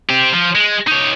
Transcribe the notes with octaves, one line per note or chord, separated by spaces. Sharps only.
C4 G4
F3
G#3
D#4 C#5